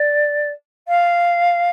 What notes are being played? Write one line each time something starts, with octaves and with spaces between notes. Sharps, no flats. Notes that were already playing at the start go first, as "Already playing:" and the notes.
Already playing: D5
F5